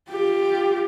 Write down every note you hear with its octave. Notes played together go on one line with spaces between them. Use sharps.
F4 G4